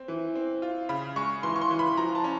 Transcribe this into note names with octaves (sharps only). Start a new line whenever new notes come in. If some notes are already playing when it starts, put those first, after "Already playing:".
Already playing: C4
E3
C4
F4
C#3 B5
G#3 C#6
E3 C6
C#6
C6
E3
B5
F3 A#5
A5
C#4